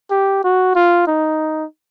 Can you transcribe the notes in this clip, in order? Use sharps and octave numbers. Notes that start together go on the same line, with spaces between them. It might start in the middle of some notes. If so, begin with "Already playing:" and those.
G4
F#4
F4
D#4